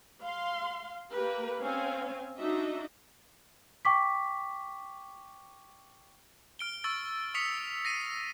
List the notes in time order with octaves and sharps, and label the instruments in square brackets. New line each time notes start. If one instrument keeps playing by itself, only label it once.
[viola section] F5 C6
A#3 G4 A#4 B4
C4 C#4 F5 G#5
D4 D#4 F#4 D#5 E5
[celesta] G5 C#6 D6 B6
[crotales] F6 D7 G7
C#6 E6 A6
C#6 D#6 B6 C#7 F7
A#6 C7 D#7